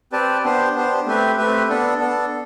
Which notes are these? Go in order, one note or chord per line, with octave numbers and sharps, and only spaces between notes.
C4 G4 B4 D5 A5
B3 D4 G4 C5
B3 D4 G4 C5
A3 C4 G4 B4 E5
A3 C4 G4 B4 E5
B3 D4 A4
B3 D4 A4